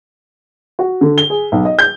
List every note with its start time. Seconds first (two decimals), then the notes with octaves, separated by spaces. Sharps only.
0.79 F#4
1.01 D3
1.18 G7
1.30 G#4
1.52 B1
1.65 D#5
1.79 G6